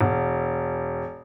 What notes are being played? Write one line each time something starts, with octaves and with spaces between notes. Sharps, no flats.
E1